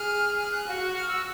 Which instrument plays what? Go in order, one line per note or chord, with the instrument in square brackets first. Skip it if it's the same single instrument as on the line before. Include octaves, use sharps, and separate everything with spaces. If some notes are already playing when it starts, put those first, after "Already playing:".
Already playing: [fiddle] G#4 [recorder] F6
[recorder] F6
F#6
[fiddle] F#4
[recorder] F6
E6